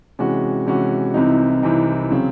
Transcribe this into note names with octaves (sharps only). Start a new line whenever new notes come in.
C3 E3 G#3 C#4 F#4
C3 E3 G#3 C#4 F#4
C2 C3 E3 C4 D#4
C2 C3 E3 C4 D#4
C#3 F#3 C4